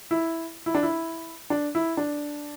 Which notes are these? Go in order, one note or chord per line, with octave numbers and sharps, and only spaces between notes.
E4
E4
D4
E4
D4
E4
D4